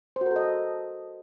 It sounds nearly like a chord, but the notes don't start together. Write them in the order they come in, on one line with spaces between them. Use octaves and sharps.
C5 F#4 A#4 A4 D#5